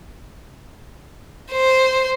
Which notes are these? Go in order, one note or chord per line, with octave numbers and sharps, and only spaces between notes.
C5